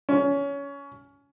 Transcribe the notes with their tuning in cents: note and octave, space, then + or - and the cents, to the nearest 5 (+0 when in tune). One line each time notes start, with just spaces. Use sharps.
C#4 +20